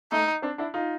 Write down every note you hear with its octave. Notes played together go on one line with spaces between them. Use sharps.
A3 D#4
C4 D4
D4 E4
D#4 F4